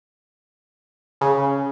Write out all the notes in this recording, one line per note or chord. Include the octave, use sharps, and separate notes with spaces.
C#3